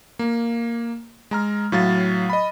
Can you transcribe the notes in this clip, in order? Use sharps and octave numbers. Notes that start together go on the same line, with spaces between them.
A#3
G#3 A#5 F6
A2 F#3 F5 A6
D#5 B5